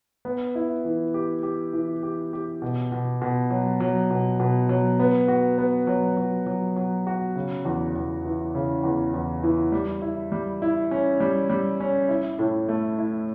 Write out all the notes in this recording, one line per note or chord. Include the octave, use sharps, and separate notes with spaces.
B3
E4
E3
G4
G4
E3
G4
G4
B2
B2
B2
F#3
F#3
B2
B2
F#3
B3
F#4
B3
F#3
F#3
F#3
F#3
F#4
C#3
E2
E2
E3
C#3
E2
E2
E3
G3
E4
G3
E4
C#4
G3
G3
C#4
E4
A2
A3
E4